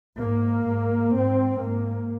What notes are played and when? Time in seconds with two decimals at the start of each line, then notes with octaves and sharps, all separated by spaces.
0.18 G#2 A#3
0.66 G#2
1.14 G#2 C4
1.62 G#2 A#3